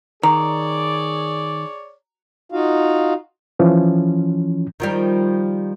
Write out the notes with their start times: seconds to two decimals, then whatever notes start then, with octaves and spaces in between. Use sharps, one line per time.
0.23 D#3 G#4 C#5 D5 A#5
2.52 D#4 F4 F#4 F5
3.59 E3 F3 C#4
4.80 D#3 F3 G3